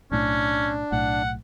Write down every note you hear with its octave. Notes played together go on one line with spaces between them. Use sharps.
B1 A2 C#4 D4
B1 A2 F#5